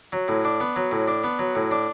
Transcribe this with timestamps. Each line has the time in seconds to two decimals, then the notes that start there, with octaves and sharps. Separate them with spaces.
0.13 F#3
0.28 A2
0.45 D4
0.60 B3
0.76 F#3
0.91 A2
1.08 D4
1.24 B3
1.39 F#3
1.55 A2
1.71 D4